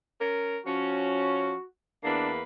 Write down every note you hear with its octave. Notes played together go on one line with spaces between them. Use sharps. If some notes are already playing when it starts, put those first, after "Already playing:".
C#4 A#4
F3 C#4 F#4
E2 A#3 D4 B4